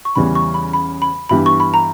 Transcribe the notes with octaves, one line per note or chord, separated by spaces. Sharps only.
C#6
E2 C#3 E3 G3 B5
C#6
B5
B5
B5
G2 E3 B3 E4 G4 B5
C#6
B5
A#5